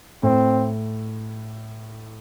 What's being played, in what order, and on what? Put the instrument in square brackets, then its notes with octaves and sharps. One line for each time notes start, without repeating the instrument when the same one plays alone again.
[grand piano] A2 [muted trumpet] C4